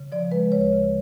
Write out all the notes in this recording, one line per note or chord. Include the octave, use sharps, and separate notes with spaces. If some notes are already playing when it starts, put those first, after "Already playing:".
Already playing: C#3
F3 D5
G#3 B4
D2 C#5
C#3